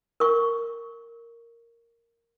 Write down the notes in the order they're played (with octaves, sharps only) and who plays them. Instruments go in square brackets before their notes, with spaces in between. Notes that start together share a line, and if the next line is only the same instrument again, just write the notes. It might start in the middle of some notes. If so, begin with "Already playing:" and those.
[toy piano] A#4 C#6